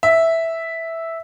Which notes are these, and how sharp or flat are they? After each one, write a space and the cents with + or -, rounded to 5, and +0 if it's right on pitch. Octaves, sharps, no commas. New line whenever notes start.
E5 -5